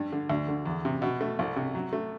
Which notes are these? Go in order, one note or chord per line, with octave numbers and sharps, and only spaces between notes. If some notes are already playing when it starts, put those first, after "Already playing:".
Already playing: G2
D3
D2
D3
E2
C3
B2
A3
C2
C3
F#3
A3